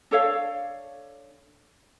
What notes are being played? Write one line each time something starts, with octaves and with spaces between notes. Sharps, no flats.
D4 A4 C#5 F5